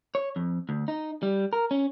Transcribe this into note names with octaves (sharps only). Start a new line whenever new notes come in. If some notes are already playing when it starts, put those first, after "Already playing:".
C#5
F2
D2
D#4
G3
A#4
C#4